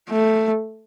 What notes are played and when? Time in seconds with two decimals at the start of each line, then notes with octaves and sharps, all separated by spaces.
0.09 A3